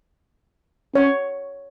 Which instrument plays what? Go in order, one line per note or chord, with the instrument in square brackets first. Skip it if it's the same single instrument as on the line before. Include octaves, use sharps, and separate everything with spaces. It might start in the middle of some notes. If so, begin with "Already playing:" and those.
[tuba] C#4 [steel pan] C#5